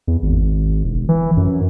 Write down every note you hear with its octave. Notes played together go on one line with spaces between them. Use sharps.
E2
G#1
E1
E3
F#2